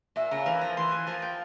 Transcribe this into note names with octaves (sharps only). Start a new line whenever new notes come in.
A#2 E5
C#3 A#5
E3 A#4
F3 A#5
E3 C6
G#5
F3 A#4
G5